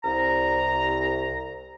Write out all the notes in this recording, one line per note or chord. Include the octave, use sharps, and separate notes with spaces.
C2 A#5